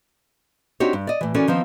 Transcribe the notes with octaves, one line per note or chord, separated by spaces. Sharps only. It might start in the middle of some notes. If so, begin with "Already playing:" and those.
C4 D4 D#4 F#4 G4 C#5
G2
D5 D#5
A2 E3
E3 C#4 F#4 A4 A#4 D5
D#3 F3 B3 C4